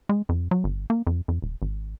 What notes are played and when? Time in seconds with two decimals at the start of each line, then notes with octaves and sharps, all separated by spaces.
0.09 G#3
0.29 F2
0.51 F#3
0.64 G1
0.90 A#3
1.07 F2
1.28 F2
1.42 D#1
1.62 G#1